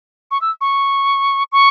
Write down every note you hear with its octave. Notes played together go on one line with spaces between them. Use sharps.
C#6
E6
C#6
C#6